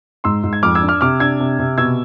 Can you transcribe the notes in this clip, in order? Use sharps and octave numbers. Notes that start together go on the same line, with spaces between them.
G#2 C6 E6
G#2
G#6
F2 D6 F6
E6 G#6
D4
D6 F6
C3 D6 F6
D4 E6 G#6
C3
C3
B2 E6 G#6